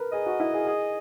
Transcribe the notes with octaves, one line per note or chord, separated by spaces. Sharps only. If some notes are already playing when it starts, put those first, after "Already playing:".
Already playing: A#4 B4
G#4 D#5
F#4
E4
G#4
G#4